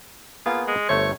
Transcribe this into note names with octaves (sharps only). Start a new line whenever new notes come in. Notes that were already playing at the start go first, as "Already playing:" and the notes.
A#3 B3 F4 G#4
G#3
G1 A3 C5 C#5